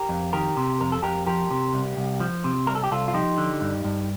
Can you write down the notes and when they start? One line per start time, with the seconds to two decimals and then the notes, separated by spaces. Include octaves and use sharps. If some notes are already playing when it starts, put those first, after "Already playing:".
Already playing: G4 A#4
0.09 F2
0.33 D#3 G4 A#4
0.57 C3
0.80 F2 A#4
0.92 A4
1.03 F2 G4 A#4
1.27 F3 G4 A#4
1.51 C3
1.74 C2
1.97 C2
2.20 F3
2.44 C3
2.67 C2 A#4
2.75 A4
2.84 G4
2.91 C2 F4 A4
3.08 F4
3.14 F3 D#4 G4
3.38 D3
3.61 G2
3.85 G2